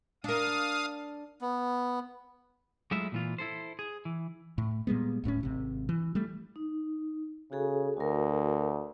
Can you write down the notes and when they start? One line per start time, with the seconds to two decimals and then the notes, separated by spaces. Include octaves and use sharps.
0.24 D4 A#4 F5 D#6
1.41 B3
2.91 F#3 G#3 A3 E4 F4 E5
3.12 A#2 E3 F4
3.38 E4 A4 C5
3.79 G#4
4.05 E3
4.58 A2
4.87 A#2 G3 G#3 B3
5.24 D1 A2 B3 C#4
5.43 G#1 C3
5.89 E3
6.15 G3 A3
6.56 D#4
7.52 C#3 F#4 G#4 A4
7.97 D2 F#4 A#4